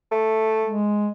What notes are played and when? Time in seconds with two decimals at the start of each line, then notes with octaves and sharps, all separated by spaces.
0.12 A3
0.65 G#3